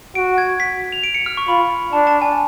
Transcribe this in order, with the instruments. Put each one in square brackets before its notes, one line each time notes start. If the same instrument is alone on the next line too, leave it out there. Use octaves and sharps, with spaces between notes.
[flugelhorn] F#4 [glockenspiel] D7
[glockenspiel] G#6
B6
F7
D7
C#7
F6
C#6
[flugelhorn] F4 [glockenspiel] B5
[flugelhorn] D4 [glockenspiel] A5
[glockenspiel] A5
G#5